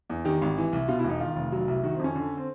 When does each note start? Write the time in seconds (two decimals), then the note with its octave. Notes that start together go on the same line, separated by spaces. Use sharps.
0.10 E2
0.25 D#3 G4
0.42 G#1
0.57 E3
0.73 C2
0.88 B2 F4
0.99 E4
1.04 E1 D#4
1.20 D#3 F4
1.36 F1
1.52 F#3
1.68 C2
1.83 D#3 F#4
1.94 C4
1.99 F2 C#4
2.16 D3
2.37 C4